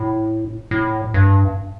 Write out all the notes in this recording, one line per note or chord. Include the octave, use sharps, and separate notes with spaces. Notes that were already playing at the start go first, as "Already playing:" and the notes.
Already playing: A2
A2
G2